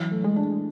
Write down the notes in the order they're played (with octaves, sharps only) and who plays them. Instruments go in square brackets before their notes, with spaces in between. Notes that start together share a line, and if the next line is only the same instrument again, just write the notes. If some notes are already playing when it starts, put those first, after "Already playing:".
Already playing: [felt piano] E3 [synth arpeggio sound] F#3
[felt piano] A3
[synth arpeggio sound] G#3
[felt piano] D4